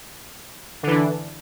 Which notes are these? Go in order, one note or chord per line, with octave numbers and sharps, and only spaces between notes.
D3 E3 D4